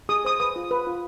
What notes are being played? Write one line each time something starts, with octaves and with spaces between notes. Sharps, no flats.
G#4 D#6
C5 D#6
B4 D#6
F4
B4
F4